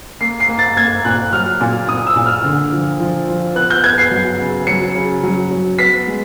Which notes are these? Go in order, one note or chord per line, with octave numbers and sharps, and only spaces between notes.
A#3 C7
C7
A#3
A6
A#3 G#6
A#2 F#6
F#3 F6
A#2
A#2 D#6
E6
A#2
F6
D3
F3
F3
F3
B3 F#6
G6
B3 G#6
C7
F#3
C#3
F#3 C#7
C#3
F#3
F#3
B3 B6
G#3